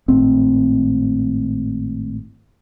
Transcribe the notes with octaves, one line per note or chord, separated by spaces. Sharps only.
G#1 A2 C4